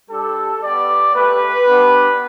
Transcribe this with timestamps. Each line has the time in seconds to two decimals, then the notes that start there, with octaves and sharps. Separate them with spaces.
0.10 G3 D4 G4 A4
0.63 B3 G4 D5
1.15 A3 G4 B4
1.67 B3 D4 G4